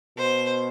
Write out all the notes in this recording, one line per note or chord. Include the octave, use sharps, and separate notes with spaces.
B2 C5